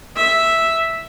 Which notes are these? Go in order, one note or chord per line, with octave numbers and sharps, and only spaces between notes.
E5